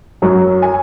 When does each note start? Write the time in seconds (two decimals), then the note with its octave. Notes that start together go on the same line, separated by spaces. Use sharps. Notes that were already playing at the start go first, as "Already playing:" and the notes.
0.22 F#2 F#3
0.62 G#5